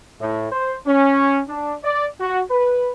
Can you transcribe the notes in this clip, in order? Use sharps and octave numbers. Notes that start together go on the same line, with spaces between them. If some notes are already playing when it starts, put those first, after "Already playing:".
A2
C5
C#4
D4
D5
F#4
B4